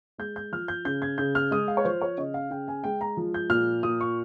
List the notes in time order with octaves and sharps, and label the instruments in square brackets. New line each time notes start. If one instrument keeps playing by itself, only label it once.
[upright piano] G#3 G6
G6
F3 F6
G6
C#3 G6
G#6
C#3 G6
F6
G#3 D#6
F5
C#5
F3 C5
C#5
C#3 D#5
F5
C#3 G5
G#5
G#3 G5
A#5
F3
G6
A#2 F6
A#2 D#6
C#6